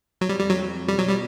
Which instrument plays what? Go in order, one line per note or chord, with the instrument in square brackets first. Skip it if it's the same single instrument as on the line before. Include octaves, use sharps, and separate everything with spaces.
[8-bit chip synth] F#3
[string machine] F2 [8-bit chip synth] G3
[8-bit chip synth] G3
F#3
[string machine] F2
[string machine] B2 [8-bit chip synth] G3
[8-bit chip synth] F#3
G3